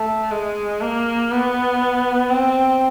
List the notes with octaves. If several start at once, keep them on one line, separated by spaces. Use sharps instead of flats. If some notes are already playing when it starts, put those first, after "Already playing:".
Already playing: A3
G#3
A#3
B3
C4